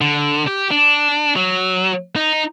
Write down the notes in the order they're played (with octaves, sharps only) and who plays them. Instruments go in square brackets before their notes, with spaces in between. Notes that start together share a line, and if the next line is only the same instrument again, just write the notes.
[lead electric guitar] D3
G4
D4
F#3
D#4